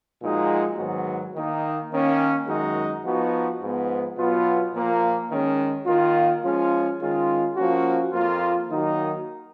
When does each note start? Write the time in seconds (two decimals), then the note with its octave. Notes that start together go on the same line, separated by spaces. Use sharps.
0.21 A#2 F3 G#3 D#4 F#4
0.78 G#2 D#3 F#3 B3 F#4
1.35 D#3 A#3 D#4
1.92 D#3 A#3 C#4
2.47 F#2 D#3 G#3 D#4 F#4
3.04 F3 B3 D#4 F#4
3.61 G#2 F3 B3
4.17 B2 F#3 B3 F4
4.73 A#2 F3 A#3
5.30 D#3 G#3 C#4
5.86 D#3 A#3 F4
6.44 F3 G#3 C#4 F4
7.00 D#3 G#3 C#4 F4
7.55 F3 A#3 C#4 F#4
8.12 F2 F3 A#3 F4
8.68 D#3 F#3 A#3 D#4 F#4